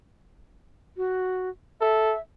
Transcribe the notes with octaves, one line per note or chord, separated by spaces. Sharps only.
F#4
A4 E5